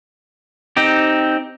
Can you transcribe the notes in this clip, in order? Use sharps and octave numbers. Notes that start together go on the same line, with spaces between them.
C4 D#4 G4